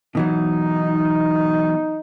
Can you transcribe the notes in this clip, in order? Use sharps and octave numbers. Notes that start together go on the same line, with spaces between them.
B2 E3 F#3 D#4